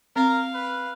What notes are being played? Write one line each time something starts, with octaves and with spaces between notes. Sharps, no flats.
C4 A#4 F5
B4